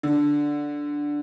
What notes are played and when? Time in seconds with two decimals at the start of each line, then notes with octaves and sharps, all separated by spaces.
0.03 D3